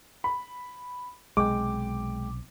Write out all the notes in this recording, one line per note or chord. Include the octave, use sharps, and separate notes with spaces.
B5
B1 C3 G#3 G5 D6